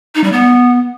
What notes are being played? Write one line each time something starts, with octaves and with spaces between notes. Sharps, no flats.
D#4
G3
B3